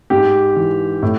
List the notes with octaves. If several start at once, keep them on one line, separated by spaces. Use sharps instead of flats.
G#2 G4
E3
A2